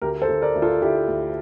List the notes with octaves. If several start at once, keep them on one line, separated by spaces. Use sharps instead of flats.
D2 G4 A#4
A4 C5
D2
A#4 D5
D2
F4 A4
D2 E4 G4
D2